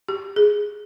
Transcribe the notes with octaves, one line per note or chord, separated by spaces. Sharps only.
G4
G#4